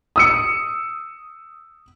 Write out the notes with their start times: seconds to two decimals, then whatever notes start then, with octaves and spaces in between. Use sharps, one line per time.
0.16 D#6 E6 C#7